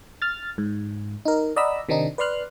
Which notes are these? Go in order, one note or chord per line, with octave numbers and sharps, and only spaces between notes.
F6 A6
G#2
D#4 A#4
D5 D#5 F#5 A#5 B5 E6
C3 D#3 C4 D4 D#4
B4 D5 C6 F6 F#6